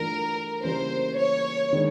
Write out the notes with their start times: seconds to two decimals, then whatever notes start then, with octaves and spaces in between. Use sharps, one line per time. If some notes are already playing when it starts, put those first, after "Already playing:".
Already playing: G2 E3 A3 D4 F4 A#4
0.63 C#3 E3 G3 A#3 C5
1.18 C#5
1.73 D#3 G#3 B3 D4